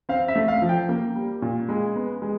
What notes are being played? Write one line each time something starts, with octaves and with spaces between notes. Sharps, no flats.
C4 F5
E5
A3
F5
F3
G5
A#3
G3
A#2
G#3
B3
G#3